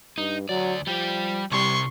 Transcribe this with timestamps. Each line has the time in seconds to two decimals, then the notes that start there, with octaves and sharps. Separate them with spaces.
0.18 G2 D#4
0.49 D2 F#3 D5
0.87 F3 G3 G4
1.51 C2 C3 G3 C6 C#6